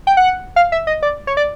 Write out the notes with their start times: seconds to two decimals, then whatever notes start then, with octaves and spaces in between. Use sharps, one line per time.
0.07 G5
0.17 F#5
0.56 F5
0.72 E5
0.87 D#5
1.02 D5
1.27 C#5
1.37 D5